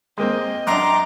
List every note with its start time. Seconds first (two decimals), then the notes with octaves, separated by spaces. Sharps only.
0.18 G#3 A#3 C4 D#5 G5
0.67 F#2 D4 A#5 C6 D6